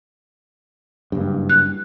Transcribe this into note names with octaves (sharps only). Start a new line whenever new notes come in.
F#1 G2
F#6